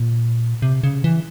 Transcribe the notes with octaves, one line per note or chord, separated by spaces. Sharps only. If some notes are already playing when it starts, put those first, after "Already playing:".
Already playing: A#2
C3
C#3
E3